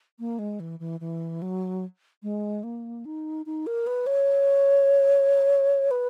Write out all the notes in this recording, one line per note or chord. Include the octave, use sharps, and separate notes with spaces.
A#3
G#3
E3
E3
E3
F#3
G#3
A#3
D#4
D#4
A#4
B4
C#5
B4